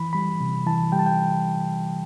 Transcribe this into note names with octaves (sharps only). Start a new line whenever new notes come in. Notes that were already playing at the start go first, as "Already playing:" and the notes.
Already playing: E3 B5
G3 B5
C3
E3 A5
G3 G5
A5
G5